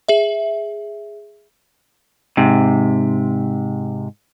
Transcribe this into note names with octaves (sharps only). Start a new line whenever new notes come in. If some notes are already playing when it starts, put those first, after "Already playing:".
G#4 E5
G#2 C3